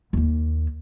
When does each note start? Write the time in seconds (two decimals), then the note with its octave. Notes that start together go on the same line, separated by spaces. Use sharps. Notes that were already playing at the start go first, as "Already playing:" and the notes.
0.13 D#2 A#3